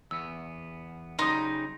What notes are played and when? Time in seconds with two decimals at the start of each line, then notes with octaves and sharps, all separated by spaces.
0.11 E2 B3 E6
1.19 C#3 F#3 G3 D#4 C6 D#6